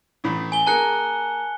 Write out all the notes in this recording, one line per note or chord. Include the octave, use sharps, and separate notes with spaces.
A1 A2 B5
G#5 G7
A#3 G#4 A#4 A5 F#6 C#7